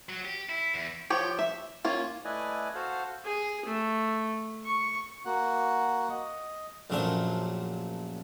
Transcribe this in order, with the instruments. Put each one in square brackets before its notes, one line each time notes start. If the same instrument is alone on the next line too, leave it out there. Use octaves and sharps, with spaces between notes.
[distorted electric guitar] F#3
G4
E4
E2
[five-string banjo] F3 G4 C#5
E5
A#3 C#4 F4
[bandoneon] A3 E4 B4 D5 D#5 G#5
F#4 A4 C5 F5
[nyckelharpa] G#4
A3
C#6
[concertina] A#3 F#4 F#5
D#5
[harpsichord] A#1 F#2 A3 D4 A#4 C5